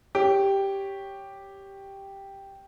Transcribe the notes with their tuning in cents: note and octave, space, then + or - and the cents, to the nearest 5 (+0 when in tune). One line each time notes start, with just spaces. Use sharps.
G4 +0 C#5 +0